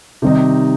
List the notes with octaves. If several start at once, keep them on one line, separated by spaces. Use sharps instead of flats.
C3 D#3 G3 C4 D#4